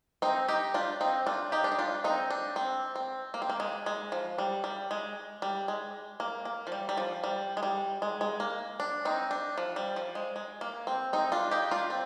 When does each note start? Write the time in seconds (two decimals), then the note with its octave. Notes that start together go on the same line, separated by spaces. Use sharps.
0.22 C4 D#4
0.48 D#4 G4
0.74 D4 F4
1.01 C4 D#4
1.27 D4 F4
1.52 D#4 G4
1.64 D4
1.72 D#4
1.79 D4 F4
2.04 C4 D#4
2.30 D4
2.56 C4
2.96 C4
3.34 A#3
3.42 C4
3.49 A#3
3.60 G#3
3.86 G#3
4.12 F3
4.38 G3
4.64 G3
4.91 G#3
5.42 G3
5.68 G#3
6.20 A#3
6.45 A#3
6.67 F3
6.72 G3
6.89 G3
6.97 F3
7.24 G3
7.57 G#3
7.63 G3
8.02 G#3
8.21 G#3
8.40 A#3
8.80 D4
9.05 C4 D#4
9.31 D4
9.58 F3
9.76 G3
9.96 F3
10.15 G#3
10.36 G#3
10.61 A#3
10.87 C4
11.13 C4 D#4
11.32 D4 F4
11.51 D#4 G4
11.71 D4 F4
11.90 C4